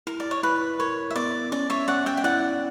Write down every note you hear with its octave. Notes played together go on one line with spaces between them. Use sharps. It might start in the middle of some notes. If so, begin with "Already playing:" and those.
E4 A#4
D5
C#5
E4 B4
A#4 C#5
E5
B3 D5
C#4 D5
C#5 E5
C#4 D5 F#5
E5 G5
G5
E4 D5 F#5